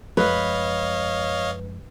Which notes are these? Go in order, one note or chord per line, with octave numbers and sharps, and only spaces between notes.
F#2 F3 G#3 B4 C#5 D#5 F5